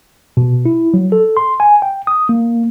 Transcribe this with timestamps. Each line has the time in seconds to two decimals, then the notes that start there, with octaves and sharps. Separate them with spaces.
0.37 B2
0.65 E4
0.94 F#3
1.12 A4
1.37 C6
1.60 G#5
1.82 G5
2.07 D#6
2.29 A#3